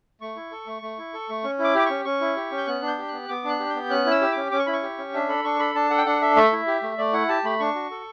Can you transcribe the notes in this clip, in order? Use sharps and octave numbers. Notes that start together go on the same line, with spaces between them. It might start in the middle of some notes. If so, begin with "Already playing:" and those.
A3 C#6
E4
A4
A3
A3
E4
A4
A3
C#4
E4
D6
G4 D6
C#4 C#6
C#4 C#6
E4
G4
C#4
G6
B3 F#6
D4
G6
G4
B3 F#6
B3 D6
D4 F#6
G4
B3 G6
C#4 F#6
E4
E6
G4
C#4 D6
C#4 D6
C#6
E4 B5
C#6
G4
C#4
D4 E5
A4 B5
D4 C#6
A4 B5
D4 A5
A4 F#5
G5
D4 F#5
A4 E5
A3 E5
E4
G4
A3
A3 D5
E4 F#5
G4 A5
A3 B5
D4 C#6
F#4
A4